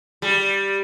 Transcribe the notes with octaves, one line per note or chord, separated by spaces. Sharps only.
G3